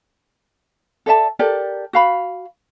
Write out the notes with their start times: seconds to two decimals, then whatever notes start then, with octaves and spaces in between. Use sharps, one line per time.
1.06 A4 D5 E5 A5
1.39 G4 A4 A#4 D5
1.93 F#4 F5 B5